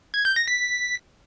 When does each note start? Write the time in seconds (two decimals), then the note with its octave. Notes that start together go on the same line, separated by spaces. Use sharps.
0.14 G#6
0.25 G6
0.36 A#6
0.48 B6